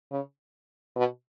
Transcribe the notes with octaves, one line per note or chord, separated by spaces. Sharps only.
C#3
B2